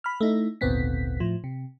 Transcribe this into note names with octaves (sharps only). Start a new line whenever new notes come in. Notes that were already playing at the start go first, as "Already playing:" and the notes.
B5 F6
A3 D#4 E4
G#1 D2 A#2 B3 C4 B6
A2 F3
C3